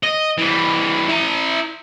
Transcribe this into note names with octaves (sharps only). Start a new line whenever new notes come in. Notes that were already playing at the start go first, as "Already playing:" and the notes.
D#5
E3 G3
E4 A#5